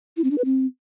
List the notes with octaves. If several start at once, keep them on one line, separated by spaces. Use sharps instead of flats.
E4
C4
D4
B4
C4